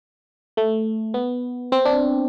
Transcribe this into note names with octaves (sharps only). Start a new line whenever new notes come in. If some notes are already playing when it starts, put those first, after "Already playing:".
A3
B3
C4
D4